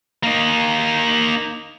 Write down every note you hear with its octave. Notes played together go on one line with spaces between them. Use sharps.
A#3 D#4